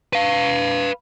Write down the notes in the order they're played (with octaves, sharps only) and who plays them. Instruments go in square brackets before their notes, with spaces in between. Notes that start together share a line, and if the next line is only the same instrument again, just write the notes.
[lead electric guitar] B4 F5